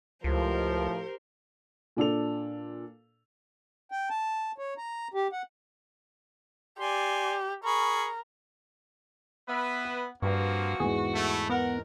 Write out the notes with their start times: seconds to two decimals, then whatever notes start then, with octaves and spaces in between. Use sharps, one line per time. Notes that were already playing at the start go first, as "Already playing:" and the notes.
0.24 C#2 A2 F3 G4 A#4 C5
1.97 A#2 D4 A4 F7
3.91 G5
4.10 A5
4.58 C#5
4.78 A#5
5.14 G4
5.33 F#5
6.80 G4 D5 G#5 C6
7.65 G#4 A#4 B5 C#6
9.48 B3 B4 E5
9.85 F#5
10.22 G2 F3 A#3 C4 F#4 B4 F5
10.80 E2 G#2 G#4
11.15 A3 E4
11.50 B3 A#4 F#5